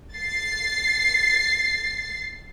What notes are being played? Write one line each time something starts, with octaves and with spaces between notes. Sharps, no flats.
A6 C7